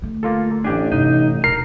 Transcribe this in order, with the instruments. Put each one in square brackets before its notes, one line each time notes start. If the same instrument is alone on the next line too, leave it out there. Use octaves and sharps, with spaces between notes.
[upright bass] D3 A3
[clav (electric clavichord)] A#3 F4 A4
[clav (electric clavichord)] A1 G4 G#5 [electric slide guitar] D4
[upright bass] G2 C3 [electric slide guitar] D#4
[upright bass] E1 E3 [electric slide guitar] A#4 [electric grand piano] C7